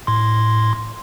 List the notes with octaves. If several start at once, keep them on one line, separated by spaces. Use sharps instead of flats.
A2 C6